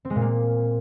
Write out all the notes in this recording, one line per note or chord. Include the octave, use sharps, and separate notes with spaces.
C4
G#3
A#2
A#3